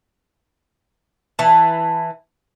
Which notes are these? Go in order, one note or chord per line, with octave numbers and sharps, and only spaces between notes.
E3 A5